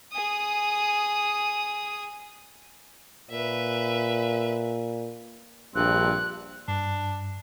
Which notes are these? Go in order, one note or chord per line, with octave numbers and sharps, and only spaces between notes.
G#4 D#6
A#2 B4 E5
A#1 G2 C4 F#6
G2 D4